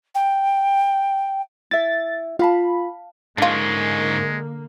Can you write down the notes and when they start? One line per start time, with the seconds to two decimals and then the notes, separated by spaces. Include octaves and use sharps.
0.15 G5
1.71 E4 E5 A6
2.39 F4 F5 A5 B5
3.38 G#2 D3 G#3 A#3 C#4 D4 F4